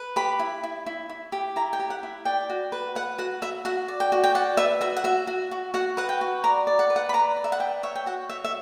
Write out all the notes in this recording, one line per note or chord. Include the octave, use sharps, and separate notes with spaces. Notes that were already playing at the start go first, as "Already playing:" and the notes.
Already playing: B4
G4 B5
E4
E4
E4
E4
G4
E4 A#5
G5
G4
F#5
E4
D5 G5
F#4
B4
B4 F#5
F#4 F#5
F#4 E5
F#4 F#5
D5
G5
F#4
G5
D5 F#5
B4 E5
F#4 E5
F#5
F#4 E5
F#4
F#4
F#4 F#5
B4 F#5
G5
F#4
D5 A#5
D5
F#5
B4
F#5
B5
D5 A#5
D5
E5
F#5
B4 G5
C#5 E5
G5
F#4 F#5
C#5 E5
E5